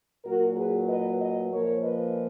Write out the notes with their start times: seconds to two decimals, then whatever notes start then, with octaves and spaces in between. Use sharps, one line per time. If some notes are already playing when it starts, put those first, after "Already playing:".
0.25 A#2 F#3 F#4 A#4
0.57 G#4 B4
0.89 B4 D#5
1.20 B4 D#5
1.52 A#2 F3 A#4 C#5
1.84 B4 D#5